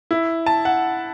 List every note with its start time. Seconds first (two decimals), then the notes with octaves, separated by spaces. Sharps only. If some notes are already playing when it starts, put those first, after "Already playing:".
0.11 E4
0.46 A5
0.65 F#5